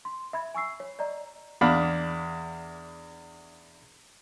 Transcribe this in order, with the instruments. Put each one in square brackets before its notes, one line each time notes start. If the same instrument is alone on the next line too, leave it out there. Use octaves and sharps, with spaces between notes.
[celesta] C6
E5 B5 G#6
G#5 C#6 E6 C7
C#5
D5 D#5 A#5
[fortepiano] E2 D4 F5 B5